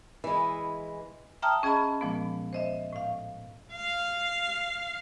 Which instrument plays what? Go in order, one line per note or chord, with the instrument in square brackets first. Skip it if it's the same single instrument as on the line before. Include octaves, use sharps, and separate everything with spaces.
[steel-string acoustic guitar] E3 G#3
[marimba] E5 G5 A5 A#5 D#6 F6
C#4 G#4 D#5 A5 B5
A#2 F3 G#3 B3
C5 D#5 E5
A2 F5
[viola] F5